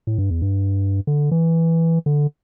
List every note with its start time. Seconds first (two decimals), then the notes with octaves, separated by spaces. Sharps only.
0.07 A2
0.18 G2
0.31 E2
0.42 G2
1.07 D3
1.31 E3
2.06 D3